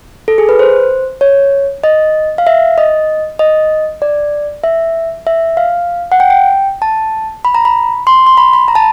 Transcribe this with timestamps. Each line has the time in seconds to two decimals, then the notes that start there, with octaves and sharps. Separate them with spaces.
0.28 A4
0.38 G#4
0.49 B4
0.59 C5
1.21 C#5
1.84 D#5
2.38 F5
2.47 E5
2.78 D#5
3.39 D#5
4.02 D5
4.64 E5
5.27 E5
5.57 F5
6.12 F#5
6.20 G5
6.30 G5
6.82 A5
7.45 B5
7.55 A#5
7.65 B5
8.07 C6
8.27 C6
8.37 B5
8.53 B5
8.68 A#5
8.75 A5